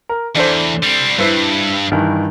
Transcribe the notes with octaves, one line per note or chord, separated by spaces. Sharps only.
A#4
E2 D4 A4 C5
G3 C4
G2 E4 B4 C5
G2 D#3 E3